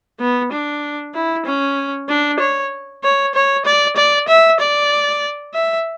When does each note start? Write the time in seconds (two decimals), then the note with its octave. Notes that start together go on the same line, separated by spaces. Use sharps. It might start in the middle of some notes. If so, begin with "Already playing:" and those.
0.20 B3
0.52 D4
1.14 E4
1.46 C#4
2.09 D4
2.40 C#5
3.04 C#5
3.35 C#5
3.66 D5
3.97 D5
4.28 E5
4.60 D5
5.54 E5